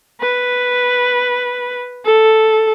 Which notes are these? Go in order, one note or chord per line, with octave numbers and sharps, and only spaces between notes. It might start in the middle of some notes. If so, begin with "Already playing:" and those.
B4
A4